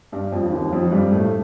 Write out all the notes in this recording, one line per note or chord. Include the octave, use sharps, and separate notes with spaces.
G2 G3
F2 F3
D#2 D#3
F2 F3
G2 G3
A2 A3